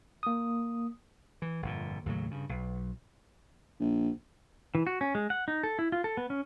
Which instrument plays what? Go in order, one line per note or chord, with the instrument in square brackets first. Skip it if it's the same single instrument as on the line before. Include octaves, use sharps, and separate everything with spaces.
[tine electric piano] A#3 D#6
[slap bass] E3
G1 F2 A#2
D#2 A2 C#3 F#3
G2 C#3
B1
[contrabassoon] A#1
[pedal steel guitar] E3
F#4
C#4
G#3
F#5
D#4
A4
E4
F4
A4
B3
C#4